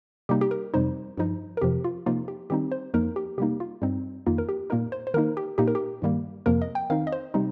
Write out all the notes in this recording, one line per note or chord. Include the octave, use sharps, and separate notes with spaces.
C3 G3 A#3 D#4 G4
G4
A#4
F2 C3 G3 D#4 C5
G2 F3 D#4
A#4
F2 C3 F3 G4
F4
C3 F3 A#3 D#4 F4
G4
D#3 G3 C4 D#4 G4
C5
F2 F3 A#3 D#4 A#4
G4
C3 G3 A#3 D#4 G4
F4
G2 G3 C4 D#4
F2 D#3 A#3 D#4 F4
A#4
G4
A#2 A#3 D#4 A#4
C5
C5
D#3 A#3 D#4 A#4
G4
A#2 A#3 D#4 G4
A#4
G4
G2 D#3 G3 A#3
F2 C3 F3 A#3 A#4
D#5
G5
D#3 C4 D#4 F5
D#5
C5
C3 G3 C4 D#4